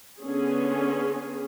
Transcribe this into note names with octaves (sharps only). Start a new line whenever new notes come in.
D3 B3 C#4 G#4